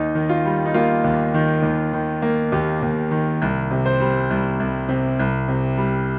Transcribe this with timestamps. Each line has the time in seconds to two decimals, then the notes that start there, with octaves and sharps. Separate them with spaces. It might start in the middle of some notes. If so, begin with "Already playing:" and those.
Already playing: D#2 D#4
0.15 D#3
0.29 F4
0.45 G3
0.66 D#4
0.74 A#3 F4
1.04 D#2
1.34 D#3
1.63 D#2
1.93 D#3
2.22 A#3
2.52 D#2 G4
2.82 D#2
3.11 D#3
3.42 C2
3.71 C3
3.86 C5
4.01 G3
4.30 C2
4.60 C2
4.89 C3
5.19 C2
5.48 C3
5.77 G3